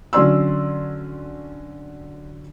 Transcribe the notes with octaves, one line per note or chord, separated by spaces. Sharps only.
D3 F#3 C#4 D5 C6 E6